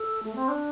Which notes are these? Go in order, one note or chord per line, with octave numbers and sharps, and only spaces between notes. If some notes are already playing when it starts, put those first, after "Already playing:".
Already playing: A4
A3
C4
D4